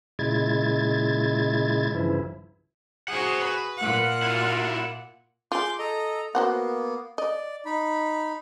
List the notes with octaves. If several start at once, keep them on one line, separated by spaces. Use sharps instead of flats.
A#2 C#3 G#3 E4 G#6 A6
G2 C#3 E3 F3 E4
F#4 G#4 C5 F#5
B4
A#2 F#5
E4 F4
F4 G#4 C6 D6 G6
A4 D#5 A#5
A#3 B3 F#4 C5 F#5
D5 D#5
D#4 B5